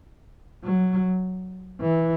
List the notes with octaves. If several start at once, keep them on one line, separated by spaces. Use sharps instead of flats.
F#3
E3